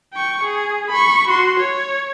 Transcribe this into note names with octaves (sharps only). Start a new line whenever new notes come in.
G5 C#6
G#4
B5 C#6
F#4 C6
C#5